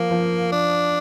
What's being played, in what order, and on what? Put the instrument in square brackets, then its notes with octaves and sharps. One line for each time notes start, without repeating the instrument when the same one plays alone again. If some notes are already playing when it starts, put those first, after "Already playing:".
Already playing: [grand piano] F3 [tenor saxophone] A#3
[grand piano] F3
[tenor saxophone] D4